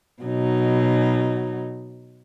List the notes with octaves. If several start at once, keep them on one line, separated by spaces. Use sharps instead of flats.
B2 F#3 D#4